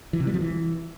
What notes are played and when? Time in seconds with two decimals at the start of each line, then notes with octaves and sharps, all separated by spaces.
0.13 E3
0.20 C3
0.27 G3
0.34 F3
0.41 E3